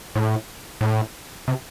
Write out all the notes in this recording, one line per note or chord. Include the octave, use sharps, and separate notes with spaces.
A2
A2
C3